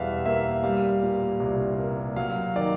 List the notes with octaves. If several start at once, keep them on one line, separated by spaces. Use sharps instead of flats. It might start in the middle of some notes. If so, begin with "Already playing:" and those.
Already playing: E2 B2 G3 E5 F5
A#3 E5
G3 F5
A#2
C2
A#3
F#3 F5
D#3 D5